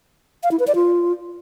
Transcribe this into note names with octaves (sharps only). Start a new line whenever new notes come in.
F5
E4
B4
D5
F4